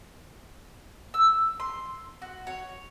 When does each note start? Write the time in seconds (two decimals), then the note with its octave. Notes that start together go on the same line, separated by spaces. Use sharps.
1.14 E6
1.60 C6
2.22 F#4
2.47 C#5